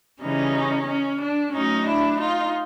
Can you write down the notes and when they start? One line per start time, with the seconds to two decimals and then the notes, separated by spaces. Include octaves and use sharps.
0.20 C#3 E3 G3 C#4 D#4
0.87 C#4
1.21 D4
1.53 A2 F#3 C#4 D#4
1.86 D4 E4
2.19 D#4 F4